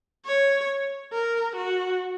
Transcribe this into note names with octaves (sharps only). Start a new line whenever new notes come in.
C#5
A#4
F#4